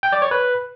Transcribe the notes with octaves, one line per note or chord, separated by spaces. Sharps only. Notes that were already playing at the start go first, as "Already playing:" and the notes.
G5
D5
C#5
B4